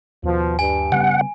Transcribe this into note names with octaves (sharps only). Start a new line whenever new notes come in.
D#2 B2 F3
G2 G#5
C#3 G3 B3 F#5